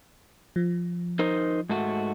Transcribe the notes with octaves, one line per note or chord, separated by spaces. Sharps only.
F3
D#4 A#4 C5
G#2 A3 F#4